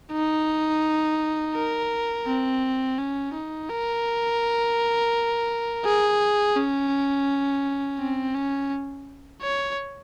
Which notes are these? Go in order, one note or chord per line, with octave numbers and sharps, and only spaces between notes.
D#4
A#4
C4
C#4
D#4
A#4
G#4
C#4
C4
C#4
C#5